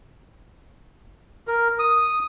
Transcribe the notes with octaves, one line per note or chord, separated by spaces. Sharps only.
A#4
D#6